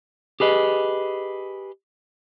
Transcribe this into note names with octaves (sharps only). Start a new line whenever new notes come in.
G4 G#4 B4 D#5